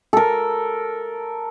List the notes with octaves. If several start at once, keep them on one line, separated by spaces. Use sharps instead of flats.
A4 A#4